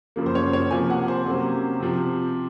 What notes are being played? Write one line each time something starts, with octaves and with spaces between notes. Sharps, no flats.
F#2 C#3 F3 A#3
C5
C#5
C#5
C3 F3 A#3 G#5
F#5
C5
C3 F#3 A#3 C#4
C3 F3 C4